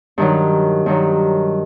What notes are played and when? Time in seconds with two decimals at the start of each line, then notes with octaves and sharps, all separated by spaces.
0.18 G2 D#3 F#3
0.86 G2 D#3 F#3